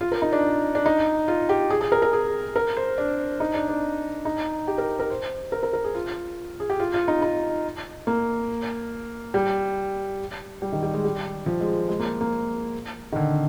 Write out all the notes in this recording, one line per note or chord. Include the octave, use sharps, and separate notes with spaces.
F4
A#4
D#4
D4
D4
D#4
F4
G4
G#4
G#4
A#4
A#4
G#4
A#4
C5
D4
D#4
D4
D4
D#4
G4
A#4
A#4
C5
A#4
A#4
A#4
G#4
F4
G#4
G4
F4
F4
D#4
D#4
A#3
G3
G3
D#3
G3
G#3
G3
F3
G#3
G#3
A#3
A#3
D#3
D3